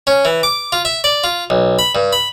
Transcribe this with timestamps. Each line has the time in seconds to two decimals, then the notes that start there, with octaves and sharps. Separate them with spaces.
0.07 C#4
0.25 E3
0.43 D6
0.72 F4
0.85 E5
1.04 D5
1.24 F4
1.50 B1
1.79 B5
1.95 G2
2.13 B5